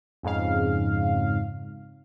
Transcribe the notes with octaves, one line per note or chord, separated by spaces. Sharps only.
F2 G#2 C#3 F5